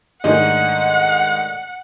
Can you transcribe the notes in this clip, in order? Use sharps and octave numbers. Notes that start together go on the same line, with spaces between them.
G#2 D#3 G#3 A3 D4 D#5 F#5